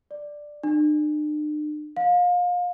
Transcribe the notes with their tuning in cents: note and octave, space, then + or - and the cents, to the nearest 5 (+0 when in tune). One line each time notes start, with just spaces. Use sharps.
D5 +5
D4 +45
F5 +30